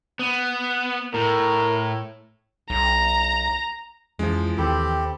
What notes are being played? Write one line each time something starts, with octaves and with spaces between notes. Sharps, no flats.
B3
A2 A#4
B1 A#5
F2 E3 F3 G#3 C#4
D#2 C4 G4 A4 B5